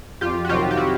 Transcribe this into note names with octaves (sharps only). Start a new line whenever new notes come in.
F2 F4 G4
F#4
C3 D#3 F#3 F4 G4
G4
E4 F#4